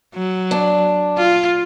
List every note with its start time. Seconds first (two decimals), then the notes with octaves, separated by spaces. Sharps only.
0.14 F#3
0.51 D4
1.17 F4